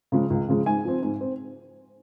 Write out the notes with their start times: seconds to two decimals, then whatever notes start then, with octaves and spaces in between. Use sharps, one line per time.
0.12 C#3 F3 G#3
0.30 C#2
0.48 C#3 F3 G#3
0.66 G#2 G#5
0.85 F3 C4
1.03 G#2
1.21 C4